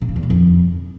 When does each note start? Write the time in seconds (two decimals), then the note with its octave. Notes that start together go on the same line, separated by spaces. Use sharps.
0.01 C3
0.09 C#3
0.16 E2
0.23 B2
0.30 F2